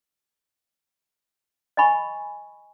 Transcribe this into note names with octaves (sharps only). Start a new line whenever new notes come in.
D#5 G#5 B5 C#6